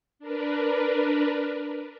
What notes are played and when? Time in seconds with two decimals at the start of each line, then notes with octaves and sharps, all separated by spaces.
0.19 D4 A#4 B4